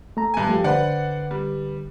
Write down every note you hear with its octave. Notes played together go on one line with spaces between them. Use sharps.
A3 A#5
G2 G#5
F3 A3 G4
D3 B4 C5 D5 F#5
G3